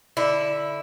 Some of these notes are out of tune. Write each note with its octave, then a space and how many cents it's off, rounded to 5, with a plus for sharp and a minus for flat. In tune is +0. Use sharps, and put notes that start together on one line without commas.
D3 +0 E4 +0